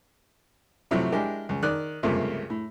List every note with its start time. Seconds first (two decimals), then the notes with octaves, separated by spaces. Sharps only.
0.91 A2 C3 F3 F#3 A3
1.12 G#3 D4 E4 G4 A#4
1.49 C#2
1.63 D#3 D5 F#6
2.03 C#2 G2 C3 F3 A3 A#3
2.50 A2